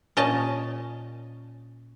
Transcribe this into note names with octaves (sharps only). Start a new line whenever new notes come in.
A#2 C#4 D#5 A5